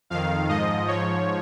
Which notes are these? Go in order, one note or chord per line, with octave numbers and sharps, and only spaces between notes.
F2 D#3 F5
G#2 F3 D#5
G#2 F3 C#5